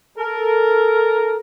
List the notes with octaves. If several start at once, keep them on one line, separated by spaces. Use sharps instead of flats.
A4 A#4